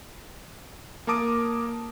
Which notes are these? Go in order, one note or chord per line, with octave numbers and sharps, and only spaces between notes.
A#3 A#4 A5 D6 D#6 D7